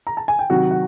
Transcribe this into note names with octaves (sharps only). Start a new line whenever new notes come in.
A#5
A5
G#5
G5
C3 D#3 F#3 F#4 F#5
F#5